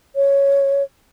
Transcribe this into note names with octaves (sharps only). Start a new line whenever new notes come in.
C#5